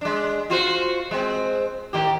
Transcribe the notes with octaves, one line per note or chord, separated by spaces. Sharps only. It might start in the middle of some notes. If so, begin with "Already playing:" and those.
G#3 D4
F4 F#4 C5
G#3 C4
A2 D#3 G4